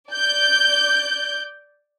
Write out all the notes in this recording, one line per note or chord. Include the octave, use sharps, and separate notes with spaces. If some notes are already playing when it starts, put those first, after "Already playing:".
D5 G6